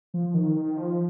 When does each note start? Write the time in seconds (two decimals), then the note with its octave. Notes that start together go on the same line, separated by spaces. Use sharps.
0.14 F3
0.34 D#3
0.56 D#3
0.77 F3